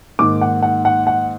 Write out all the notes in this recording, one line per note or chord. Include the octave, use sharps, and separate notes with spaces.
G#2 D#3 A#3 D6
F#5
F#5
F#5
F#5